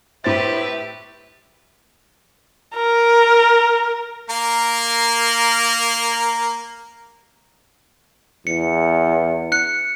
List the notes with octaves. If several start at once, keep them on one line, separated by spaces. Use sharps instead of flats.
A2 G4 B4 C5 E5 A6
A#4
A#3 A#4 F5
E2 C#7
F#6 C#7